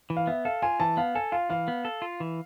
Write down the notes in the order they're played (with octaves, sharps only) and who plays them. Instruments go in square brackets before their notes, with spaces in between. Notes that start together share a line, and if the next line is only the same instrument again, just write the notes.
[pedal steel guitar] E3
[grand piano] F5
[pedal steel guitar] B3 [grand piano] E5
[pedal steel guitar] A4 [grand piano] F5
[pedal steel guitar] F4 [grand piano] G#5
[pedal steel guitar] E3 [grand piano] A5
[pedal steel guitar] B3 [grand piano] F5
[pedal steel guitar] A4 [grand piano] G#5
[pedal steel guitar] F4 [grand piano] F5
[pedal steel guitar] E3 [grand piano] F5
[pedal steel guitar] B3
A4
F4
E3